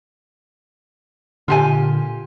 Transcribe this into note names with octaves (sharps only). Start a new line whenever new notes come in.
A#2 D3 F4 G4 G#5